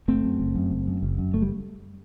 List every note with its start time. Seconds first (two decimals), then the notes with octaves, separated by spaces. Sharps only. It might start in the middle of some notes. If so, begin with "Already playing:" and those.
0.08 F#1 A3 C4
0.24 F#2
0.40 F#1
0.55 F#2
0.71 F#1
0.87 F#2
1.02 F#1
1.18 F#2
1.34 F#1 A3
1.42 G3